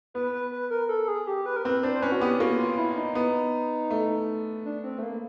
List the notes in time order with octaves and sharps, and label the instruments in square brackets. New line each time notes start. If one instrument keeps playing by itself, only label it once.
[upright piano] B3 [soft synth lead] B4
[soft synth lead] B4
B4
A#4
A4
A4
G#4
G4
B4
A#4
[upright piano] C4 [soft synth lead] B4
[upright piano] D4 [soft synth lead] C5
[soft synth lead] C5
[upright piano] C#4 [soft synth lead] B4
[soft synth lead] F#4
[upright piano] B3 [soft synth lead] G4
[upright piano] A#3 [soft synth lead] F#4
[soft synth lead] F4
E4
D#4
[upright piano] B3
A3
[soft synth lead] D4
C4
A3
A#3